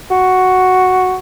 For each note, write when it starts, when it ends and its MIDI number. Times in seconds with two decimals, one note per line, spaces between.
0.11 1.16 66